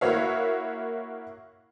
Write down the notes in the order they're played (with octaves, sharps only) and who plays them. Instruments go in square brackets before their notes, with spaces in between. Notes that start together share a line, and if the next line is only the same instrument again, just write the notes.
[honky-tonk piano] A#3 E4 F#4 C#5 E5 F5